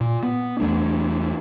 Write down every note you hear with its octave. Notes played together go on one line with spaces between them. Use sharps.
A#2
B3
E2 A3 D4